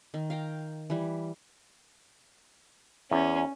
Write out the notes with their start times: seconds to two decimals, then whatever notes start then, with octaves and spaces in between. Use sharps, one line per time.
0.14 D#3
0.30 F5 G5 A#5
0.90 E3 G3
3.11 E2 C#4